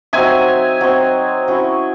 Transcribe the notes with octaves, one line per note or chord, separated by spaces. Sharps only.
F#3 C4 D#4 E5 G#5
F#3 C4 D#4
F#3 C#4 E4